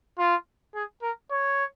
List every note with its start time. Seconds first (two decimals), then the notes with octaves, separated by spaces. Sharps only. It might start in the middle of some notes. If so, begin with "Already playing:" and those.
0.18 F4
0.75 G#4
1.02 A#4
1.31 C#5